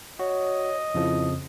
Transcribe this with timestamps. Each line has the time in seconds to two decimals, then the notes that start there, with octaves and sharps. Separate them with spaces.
0.19 F#4 C#5 D#5
0.95 F2 C#3 F3 E4